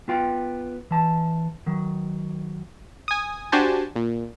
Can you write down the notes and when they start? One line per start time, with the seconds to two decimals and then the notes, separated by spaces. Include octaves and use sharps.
0.08 B3 F4 G5
0.91 E3 A5
1.66 D#3 F#3
3.08 G#5 D#6
3.52 D4 F#4 G4 C5 G#5 A5
3.96 A#2